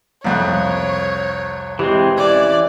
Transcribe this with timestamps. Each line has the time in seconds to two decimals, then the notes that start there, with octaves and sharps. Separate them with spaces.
0.24 C2 F2 C#5 F#6
1.79 E3 G#3 C4 G4
2.18 E3 C#4 D5